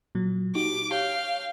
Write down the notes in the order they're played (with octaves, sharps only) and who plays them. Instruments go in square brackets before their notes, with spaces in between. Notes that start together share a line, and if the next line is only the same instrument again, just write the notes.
[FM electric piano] A#2 F#3
[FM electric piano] D#4 F#4 G4 [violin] D6
[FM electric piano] G4 C#5 [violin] F5 G5